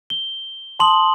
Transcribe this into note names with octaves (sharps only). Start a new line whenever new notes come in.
G7
A5 C6 D#6 F#7